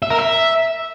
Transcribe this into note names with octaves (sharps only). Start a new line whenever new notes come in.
E5
A#4
E5